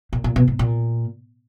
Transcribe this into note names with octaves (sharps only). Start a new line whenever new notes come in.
A#2
A#2
B2
G#2
A#2